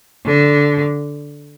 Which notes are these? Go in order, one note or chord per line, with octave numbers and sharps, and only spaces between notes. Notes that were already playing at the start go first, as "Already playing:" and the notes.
D3